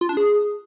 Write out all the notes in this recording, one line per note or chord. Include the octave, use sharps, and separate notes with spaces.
F4
D4
G#4